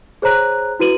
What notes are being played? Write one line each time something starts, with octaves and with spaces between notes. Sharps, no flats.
G#4 C5 C#5 A#5 F#6
E4 F#4 B4 D#7 F#7